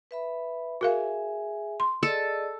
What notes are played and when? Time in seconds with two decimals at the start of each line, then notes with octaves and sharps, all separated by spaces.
0.11 B4 E5 B5
0.81 F#4 G#4 A#4 E5 F5 G#5
1.80 C6
2.03 G#4 A4 D5 D#5